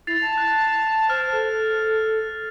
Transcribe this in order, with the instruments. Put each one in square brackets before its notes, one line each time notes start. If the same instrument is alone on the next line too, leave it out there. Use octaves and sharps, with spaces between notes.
[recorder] E4 [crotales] A6 C7 F7
[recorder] A5
[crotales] F#6
[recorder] C5 [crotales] F6
[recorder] A4